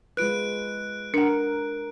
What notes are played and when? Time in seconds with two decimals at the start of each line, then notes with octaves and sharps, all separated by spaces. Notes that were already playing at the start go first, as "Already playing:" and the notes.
0.17 G#3 F4 B4 F#6 D7
1.14 D4 A#4 F#5